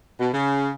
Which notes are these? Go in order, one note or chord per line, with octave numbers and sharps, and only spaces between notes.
B2
C#3